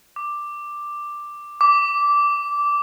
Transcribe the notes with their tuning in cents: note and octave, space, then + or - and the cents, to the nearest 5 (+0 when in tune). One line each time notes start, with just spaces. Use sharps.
D6 +5
D6 -15